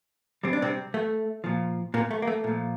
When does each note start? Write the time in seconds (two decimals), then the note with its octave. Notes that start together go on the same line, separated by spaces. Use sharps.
0.44 C3 G3 C4
0.53 D4
0.62 C3 C4
0.94 A3
1.44 A#2 F3
1.94 A#2 A#3
2.11 A3
2.22 A#3
2.27 A3
2.44 A#2 F3